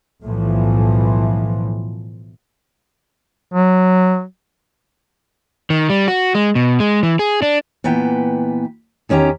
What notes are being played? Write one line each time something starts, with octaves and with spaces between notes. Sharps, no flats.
B1 A2 E3 F3
F#3
D#3
G3
F#4
G#3
B2
G#3
E3
G#4
D4
A#2 E3 B3 B4 G5
E2 D#3 C#4 G4 A#5